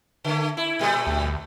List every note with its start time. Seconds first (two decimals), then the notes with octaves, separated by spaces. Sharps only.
0.24 D3 A3
0.57 E4
0.79 A#2 G3 A3
1.07 D2